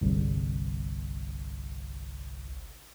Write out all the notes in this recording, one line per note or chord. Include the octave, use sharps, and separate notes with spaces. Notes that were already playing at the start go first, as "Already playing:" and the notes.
G1 C2